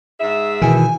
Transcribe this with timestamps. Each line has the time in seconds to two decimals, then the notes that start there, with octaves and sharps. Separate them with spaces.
0.20 G#2 G#4 E5
0.62 B2 D#3 E3 G#5